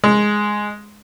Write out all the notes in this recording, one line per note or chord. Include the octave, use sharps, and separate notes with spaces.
G#3